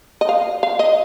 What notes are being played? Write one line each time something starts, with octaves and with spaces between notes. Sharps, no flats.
D#5
F5
F5
D#5